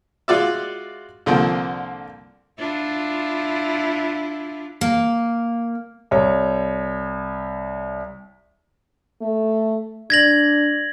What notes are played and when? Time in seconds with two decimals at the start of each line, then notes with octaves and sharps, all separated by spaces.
0.28 G#3 F4 F#4 D5 E5
1.26 C2 D3 F3 A#3 C4
2.59 D4 E4 F4
4.81 A#3
6.11 C2 C#5
9.21 A3
10.10 D4 G#6 A#6 F#7